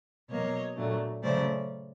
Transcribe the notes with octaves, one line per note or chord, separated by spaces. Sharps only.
B2 F#3 A#3 C#5 D#5
A#2 F#3 A3 D4
C#3 F#3 A3 C#4 C5 D5